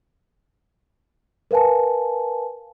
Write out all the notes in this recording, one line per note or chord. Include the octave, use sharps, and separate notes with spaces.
A#4 B4 F5 G#5 A5